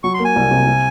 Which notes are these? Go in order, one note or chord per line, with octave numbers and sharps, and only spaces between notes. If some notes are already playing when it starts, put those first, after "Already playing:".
F#3 C#6
C6
A#3
G#5
C2
C3
C3